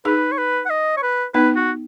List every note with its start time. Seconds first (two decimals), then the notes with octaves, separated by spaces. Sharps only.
0.05 D#4 G#4 B4
0.32 C#5
0.38 B4
0.66 F#5
0.70 D#5
0.97 C#5
1.03 B4
1.34 B3 D#4 B4
1.56 F#4